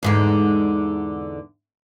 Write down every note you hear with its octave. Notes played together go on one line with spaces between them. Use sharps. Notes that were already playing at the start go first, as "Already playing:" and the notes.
E2 G#2 D3